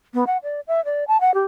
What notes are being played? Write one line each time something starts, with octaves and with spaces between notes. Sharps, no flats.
B3
F#5
D5
E5
D5
A5
F#5
G4